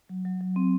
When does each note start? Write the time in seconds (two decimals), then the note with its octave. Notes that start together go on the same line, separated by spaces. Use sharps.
0.09 F#3
0.25 F#3
0.41 F#3
0.56 C4